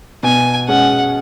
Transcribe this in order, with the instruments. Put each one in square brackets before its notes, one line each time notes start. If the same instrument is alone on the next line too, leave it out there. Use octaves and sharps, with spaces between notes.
[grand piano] B2 [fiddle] G#5
[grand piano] G#3 C#4 [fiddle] F#5